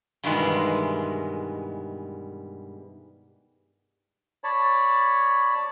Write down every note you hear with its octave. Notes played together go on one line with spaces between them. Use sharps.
G2 B2 D#3 E3 G#3
C#5 D5 A5 B5